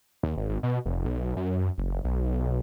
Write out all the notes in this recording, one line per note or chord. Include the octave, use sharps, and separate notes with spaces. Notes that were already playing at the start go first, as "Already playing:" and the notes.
D#2
G#1
G#1
B2
F1
B1
F#2
F#1
B1